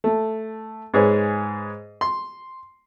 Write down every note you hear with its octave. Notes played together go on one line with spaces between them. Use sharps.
A3
G#2 G#4 B4 C#5
C6